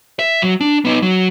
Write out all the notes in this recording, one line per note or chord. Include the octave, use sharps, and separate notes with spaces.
E5
F#3
D4
B3 D#4
F#3